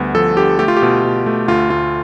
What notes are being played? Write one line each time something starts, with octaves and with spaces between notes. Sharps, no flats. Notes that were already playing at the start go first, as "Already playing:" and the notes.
Already playing: D2 G3 B3
F3 A4
D3 G4
A3 G4
F4
G4
B2
B2
A3
D2 F4
D2 F4